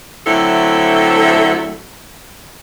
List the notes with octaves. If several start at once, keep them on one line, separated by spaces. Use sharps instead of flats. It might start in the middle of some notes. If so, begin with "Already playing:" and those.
D3 F#3 A3 C4 E4 A4